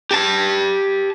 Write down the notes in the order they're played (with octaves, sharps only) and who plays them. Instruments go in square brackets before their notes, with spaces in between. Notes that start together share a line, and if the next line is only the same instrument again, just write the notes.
[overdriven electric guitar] G4 A5